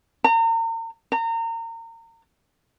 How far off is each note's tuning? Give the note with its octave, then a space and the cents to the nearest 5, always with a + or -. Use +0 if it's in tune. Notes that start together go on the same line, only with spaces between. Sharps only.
A#5 -40
A#5 -30